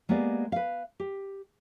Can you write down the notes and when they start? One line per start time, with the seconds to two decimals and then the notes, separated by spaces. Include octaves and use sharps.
0.09 G#3 A#3 B3 G4 D5
0.52 B4 F5
1.00 G4